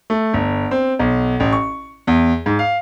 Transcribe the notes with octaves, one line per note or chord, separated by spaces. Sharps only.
A3
G1
C4
B1
A1
C#6
E2
G#2
F5